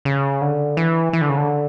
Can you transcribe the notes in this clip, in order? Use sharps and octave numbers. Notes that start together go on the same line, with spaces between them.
C#3
D3
E3
E3
D3
C#3
D3